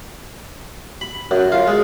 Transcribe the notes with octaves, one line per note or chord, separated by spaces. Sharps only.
B5
F#2
F4
G#3